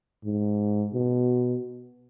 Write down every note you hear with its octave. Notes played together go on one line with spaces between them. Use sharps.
G#2
B2